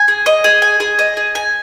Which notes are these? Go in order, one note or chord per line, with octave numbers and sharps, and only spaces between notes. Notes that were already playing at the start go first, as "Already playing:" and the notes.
Already playing: G#5
G#4
D#5
G#4
G#5
G#4
D#5
G#4
G#5